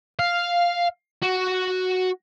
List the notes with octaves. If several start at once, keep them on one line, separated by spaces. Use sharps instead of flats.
F5
F#4